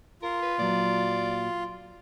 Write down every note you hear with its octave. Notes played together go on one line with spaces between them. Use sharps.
F4 A#4
B4
A#2 F#3 D5